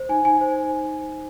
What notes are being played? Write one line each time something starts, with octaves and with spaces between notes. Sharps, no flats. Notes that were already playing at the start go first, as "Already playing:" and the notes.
Already playing: C5
D#4 G#5
D#4 G#5
C5